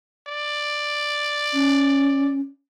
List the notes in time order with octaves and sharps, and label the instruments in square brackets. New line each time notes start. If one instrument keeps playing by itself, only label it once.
[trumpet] D5
[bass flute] C#4